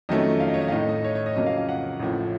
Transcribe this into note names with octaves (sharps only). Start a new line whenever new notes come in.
F2 D#3 F#3 A3 C#4 D#5
F5
D#5
C#5
D#5
F5
A2 A3 D#4 D#5
D#5
C#5
C#5
D#5
F2 C#3 F#3 A#3 D#5
F5
F5
F#5
A1 A2 F3